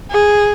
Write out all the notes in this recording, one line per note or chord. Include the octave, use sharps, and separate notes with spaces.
G#4